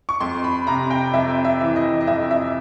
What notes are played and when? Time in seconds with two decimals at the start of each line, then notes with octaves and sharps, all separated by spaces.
0.09 C#6
0.20 F2 C6
0.44 B5
0.67 C3 A#5
0.90 G5
1.13 F2 E5
1.45 E5
1.61 E3
1.76 D#5
2.01 D#5
2.07 F2 E5
2.31 E5